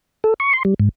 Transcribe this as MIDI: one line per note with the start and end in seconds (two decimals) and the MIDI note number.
0.24 0.34 69
0.40 0.53 85
0.53 0.63 84
0.65 0.74 55
0.80 0.89 44